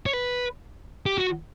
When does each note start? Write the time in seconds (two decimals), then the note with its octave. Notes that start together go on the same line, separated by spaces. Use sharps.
0.06 C#5
0.13 B4
1.06 G4
1.18 F#4